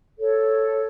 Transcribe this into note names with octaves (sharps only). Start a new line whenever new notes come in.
A4 C#5